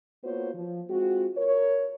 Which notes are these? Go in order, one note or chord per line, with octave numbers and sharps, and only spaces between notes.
A#3 B3 F4 F#4 C5 C#5
F3
G#3 C4 F4 F#4
A#4 C#5